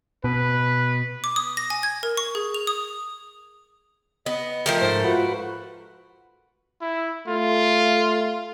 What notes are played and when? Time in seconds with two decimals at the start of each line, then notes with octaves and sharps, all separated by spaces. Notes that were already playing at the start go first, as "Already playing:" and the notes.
0.24 B2 B4
1.24 D6
1.36 D#6
1.57 A#6
1.70 G#5
1.83 G#6
2.03 A#4
2.17 C#6
2.35 G#4
2.54 F7
2.67 D#6
4.26 B3 D#5
4.66 F3 A3 A#4 G5
4.81 G#2 C5
5.04 F4 F#4 B4
6.81 E4
7.28 A3 F4